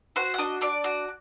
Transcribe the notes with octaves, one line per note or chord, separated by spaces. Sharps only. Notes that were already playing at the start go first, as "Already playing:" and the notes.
F#4 C5
F#5
D4 D#5
D4 D5
F#4